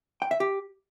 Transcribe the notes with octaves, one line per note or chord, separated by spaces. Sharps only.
G5
E5
G4